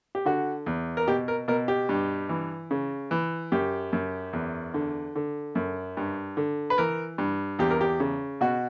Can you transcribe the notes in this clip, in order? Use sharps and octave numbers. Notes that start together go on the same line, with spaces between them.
G4
D3 F#4
E2
A#4
B2 G4
A#4
B2 A#4
G4
G2
E3
C#3
E3
F#2 G4
F#2
E2
D3
D3
F#2
G2
D3
B4
E3 A#4
G2
E2 G4
A#4
G4
C#3
B2 F#4